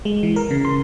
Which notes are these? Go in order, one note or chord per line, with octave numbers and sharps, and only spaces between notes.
G#3
E3
A#4
C#3
C6